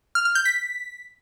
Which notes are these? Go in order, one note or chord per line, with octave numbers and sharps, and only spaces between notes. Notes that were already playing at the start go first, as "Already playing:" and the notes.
F6
F6
G6
B6